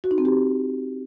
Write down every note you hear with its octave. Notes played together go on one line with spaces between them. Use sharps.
F#4
D#4
C4
G4